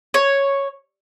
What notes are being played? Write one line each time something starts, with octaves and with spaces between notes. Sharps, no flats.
C#5